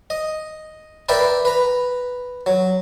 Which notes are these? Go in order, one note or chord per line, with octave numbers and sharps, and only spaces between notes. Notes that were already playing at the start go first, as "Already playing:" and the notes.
D#5
A#4 B4 D5 E5 G5
B4 A#5
F#3